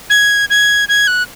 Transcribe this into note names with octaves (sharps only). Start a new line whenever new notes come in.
G#6
G#6
G#6
F#6